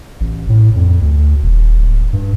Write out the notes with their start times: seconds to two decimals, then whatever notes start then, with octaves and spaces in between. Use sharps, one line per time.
0.20 A1
0.49 A2
0.76 F2
1.01 D2
1.42 D#1
1.78 D1
2.13 G2